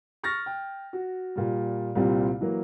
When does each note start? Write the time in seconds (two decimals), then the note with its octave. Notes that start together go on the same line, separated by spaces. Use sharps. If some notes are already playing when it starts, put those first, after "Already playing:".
0.23 C#6 F6 A6 A#6
0.46 G5
0.93 F#4
1.36 A#2 G3
1.95 C2 A#2 G3 C4
2.41 E3 F#3 A#3